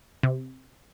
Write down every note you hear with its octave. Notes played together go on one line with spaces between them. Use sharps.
C3